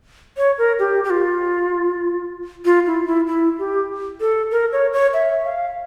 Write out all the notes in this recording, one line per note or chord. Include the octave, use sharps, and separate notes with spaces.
C#5
A#4
G4
G4
F4
F4
E4
E4
E4
G4
A4
A#4
C#5
C#5
E5
F5